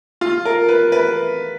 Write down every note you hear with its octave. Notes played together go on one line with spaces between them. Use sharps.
F4
A#4
B4
B4